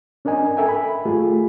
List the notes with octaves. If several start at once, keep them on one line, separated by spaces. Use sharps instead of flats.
C#4 D4 A#4 D#5 G#5
A4 A#4 E5 G5 G#5
B5
A3 F4 G4 G#4